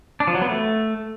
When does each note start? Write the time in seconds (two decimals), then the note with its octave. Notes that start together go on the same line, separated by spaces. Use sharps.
0.20 D4
0.27 F3
0.35 F#3
0.42 B3
0.49 A3